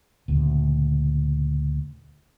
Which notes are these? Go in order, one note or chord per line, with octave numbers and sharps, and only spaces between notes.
D2 A#2 C#3